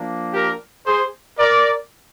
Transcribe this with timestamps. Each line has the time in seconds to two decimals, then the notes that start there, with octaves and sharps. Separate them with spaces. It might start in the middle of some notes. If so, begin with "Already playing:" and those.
Already playing: F3 A#3 D4
0.34 G4 A#4
0.86 G#4 C5
1.39 A#4 D5